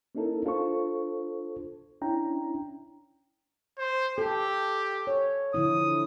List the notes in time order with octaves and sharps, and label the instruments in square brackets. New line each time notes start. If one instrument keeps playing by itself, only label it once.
[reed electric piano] A#3 C#4 D#4 E4 A4 A#4
D4 F4 A4 C5 C#6
C#4 D4 E4 G5 A#5
[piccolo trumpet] C5
[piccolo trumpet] G4 [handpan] A4
[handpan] C#5
[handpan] D3 F3 E4 [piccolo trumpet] D#6